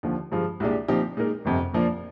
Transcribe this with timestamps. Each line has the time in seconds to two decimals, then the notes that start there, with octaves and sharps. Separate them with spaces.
0.03 D#2 D3 F3
0.32 G2 F3 G#3
0.60 C2 A#2 G#3 D4 G4
0.88 A#2 F3 C4 D#4 G4
1.17 A#2 G#3 D#4 A#4
1.45 G1 F2 C3
1.73 A#2 F3 A#3 D4